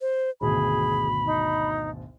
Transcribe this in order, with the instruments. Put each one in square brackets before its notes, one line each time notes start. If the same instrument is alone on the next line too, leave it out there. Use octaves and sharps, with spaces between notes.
[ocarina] C5
[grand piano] G#1 D2 B2 [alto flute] G#4 [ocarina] B5
[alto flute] D#4